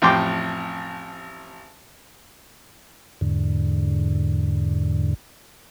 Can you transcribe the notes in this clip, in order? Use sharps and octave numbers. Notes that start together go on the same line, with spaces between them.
A1 F2 A2 G5 C6 D6
E2 G#2 D3